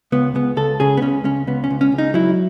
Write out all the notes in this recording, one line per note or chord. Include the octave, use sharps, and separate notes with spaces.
C#2 B3
C#2 B3
C#2 A4
C#3 G#4
B3
C#2 C#4
C#2 C#4
C#2 B3
C#4
C#2
C#4
C#2
D#4
F#3 E4